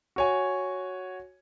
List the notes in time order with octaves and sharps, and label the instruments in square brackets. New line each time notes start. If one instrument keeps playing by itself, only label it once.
[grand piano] F#4 C#5 G#5